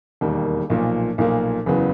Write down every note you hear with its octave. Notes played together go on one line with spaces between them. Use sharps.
E1 D#2 D#3 G3 A#3
B1 A#2 F3 A#3
B1 A#2 F3 A#3
F#1 E2 C#3 F#3 B3